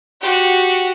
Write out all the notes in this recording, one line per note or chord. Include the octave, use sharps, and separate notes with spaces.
F#4 G4